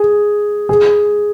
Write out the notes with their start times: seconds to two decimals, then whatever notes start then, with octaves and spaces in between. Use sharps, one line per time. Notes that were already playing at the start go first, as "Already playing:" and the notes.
Already playing: G#4
0.69 G#4